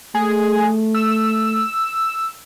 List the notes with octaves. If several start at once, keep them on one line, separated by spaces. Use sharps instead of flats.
A3 G#4
E6